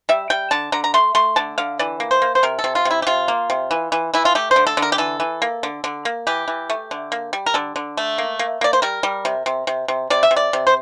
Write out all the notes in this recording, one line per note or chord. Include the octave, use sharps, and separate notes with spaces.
G3 E5
G3 G5
D3 A5
D3 A#5
A#5
A3 C6
A3 C6
D3 A5
D3 F5
E3 D5
A#3
C5
A#3
C5
C3 A#4
A4
C3
F4
C3
E4
G4
C3 F4
A#3
C3
E3
E3
E3 E4
F4
A3 G4
C5
D3
A4
D3
A#4
G4
E3 A4
E3
A#3
D3
D3
A#3
E3 G4
E3
A3
D3
A#3
G3
A#4
D3 A4
D3
A3
A#3
A#3
A#3 D5
C5
G3 A#4
G3
C3
C3
C3
C3
C3 D5
E5
C3
D5
C3
C5